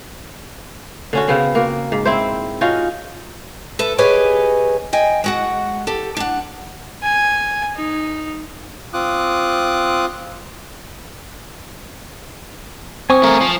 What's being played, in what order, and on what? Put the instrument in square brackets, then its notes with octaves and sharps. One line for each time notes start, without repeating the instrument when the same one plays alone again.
[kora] D3 C#4 F#4
C#3 B3 C4
A#3 F#4
G#2
C4 E4 C5
C#4 D#4 F4 F#4
[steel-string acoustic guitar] A4 B4 E5
G4 G#4 B4 C#5 D#5 G#5
D#5 G5 G#5
G#3 F#4 F#5
G4 A4
D4 F#5
[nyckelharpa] G#5
D#4
[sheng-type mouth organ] C4 F4 D6 D#6 F#6
[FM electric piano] C4 [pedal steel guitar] G#5 C#6 D#6
[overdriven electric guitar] A3 A#4
F3